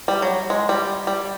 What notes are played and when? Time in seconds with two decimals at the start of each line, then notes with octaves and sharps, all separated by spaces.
0.08 G3
0.22 F#3
0.50 G#3
0.69 G3
1.07 G3